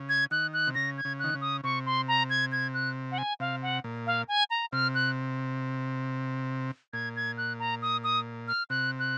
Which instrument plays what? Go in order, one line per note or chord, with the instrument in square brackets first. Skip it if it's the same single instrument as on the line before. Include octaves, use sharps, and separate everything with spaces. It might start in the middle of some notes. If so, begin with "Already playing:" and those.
Already playing: [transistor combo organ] C#3
[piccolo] G#6
[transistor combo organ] D#3 [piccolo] F#6
[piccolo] F#6
[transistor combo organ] C3
[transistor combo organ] C#3 [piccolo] A#6
[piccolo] G#6
[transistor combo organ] C#3
[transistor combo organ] D#3 [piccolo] F#6
[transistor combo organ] C#3
[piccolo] D#6
[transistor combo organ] C3 [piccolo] C#6
[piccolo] C6
A#5
G#6
G#6
F#6
F#5
G#5
[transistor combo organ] C3 [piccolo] F5
[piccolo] F#5
[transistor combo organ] A#2
[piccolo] F5
G#5
A#5
[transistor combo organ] C3 [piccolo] F6
[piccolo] F#6
[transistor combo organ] A#2 [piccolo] G#6
[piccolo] G#6
F#6
A#5
D#6
D#6
F6
[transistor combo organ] C3 [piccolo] F#6
[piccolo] F#6